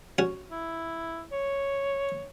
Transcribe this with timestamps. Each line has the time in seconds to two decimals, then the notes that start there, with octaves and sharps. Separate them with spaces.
0.18 C#4 F#4
0.51 E4
1.32 C#5